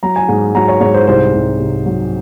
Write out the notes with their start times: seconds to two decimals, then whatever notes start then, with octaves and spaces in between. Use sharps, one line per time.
0.03 F#3 A#5
0.16 G#5
0.28 G#2
0.55 F#3 A#5
0.68 C#5
0.81 G#2 C#5
0.94 C5
1.07 C2 C5
1.34 C2
1.59 C3
1.86 F#3